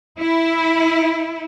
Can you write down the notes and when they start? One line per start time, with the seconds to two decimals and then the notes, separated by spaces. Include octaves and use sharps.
0.19 E4